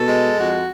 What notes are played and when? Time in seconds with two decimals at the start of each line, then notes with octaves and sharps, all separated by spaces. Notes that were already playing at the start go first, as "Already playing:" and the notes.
Already playing: B2 A4
0.08 G#3
0.38 F2 F#4